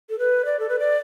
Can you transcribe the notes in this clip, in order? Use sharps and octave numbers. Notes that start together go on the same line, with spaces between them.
A4
B4
D5
A4
B4
D5